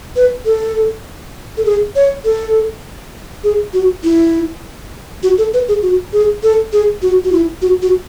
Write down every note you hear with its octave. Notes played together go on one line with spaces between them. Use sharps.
B4
A4
A4
G#4
C#5
A4
G#4
F#4
E4
F#4
A4
B4
G#4
F#4
G#4
A4
G#4
F#4
F#4
E4
F#4
F#4